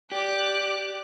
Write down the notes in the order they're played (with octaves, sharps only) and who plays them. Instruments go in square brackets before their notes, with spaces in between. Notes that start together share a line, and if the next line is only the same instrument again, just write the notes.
[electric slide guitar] G4 [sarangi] D5 [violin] D6 F#6